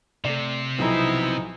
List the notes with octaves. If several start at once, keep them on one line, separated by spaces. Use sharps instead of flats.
C3 A3 D5
B1 F3 F#3 B3 C4 D#4 E4